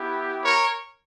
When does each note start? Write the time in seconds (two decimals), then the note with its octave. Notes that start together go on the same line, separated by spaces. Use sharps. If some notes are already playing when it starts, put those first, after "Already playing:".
Already playing: B3 E4 G4
0.44 A#4 C#5